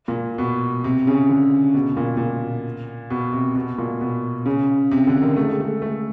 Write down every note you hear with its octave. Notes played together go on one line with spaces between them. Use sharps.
A#2
B2
C3
C#3
D3
B2
A#2
A#2
B2
C3
B2
A#2
B2
C#3
C3
D3
D#3
A3
G#3
A3
A3